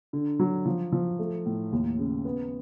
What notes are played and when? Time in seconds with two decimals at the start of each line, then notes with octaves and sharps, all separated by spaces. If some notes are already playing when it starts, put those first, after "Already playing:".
0.13 D3
0.39 F#3
0.66 F3
0.92 F3
1.19 A3
1.46 A2
1.72 D#2
1.99 C#3
2.25 B3